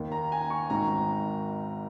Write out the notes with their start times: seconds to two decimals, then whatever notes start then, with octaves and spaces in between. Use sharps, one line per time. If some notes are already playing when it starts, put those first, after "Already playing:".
Already playing: D#2 D#3
0.12 A#5
0.32 G#5
0.50 C#6
0.70 G#1 G#2 D#3 A#5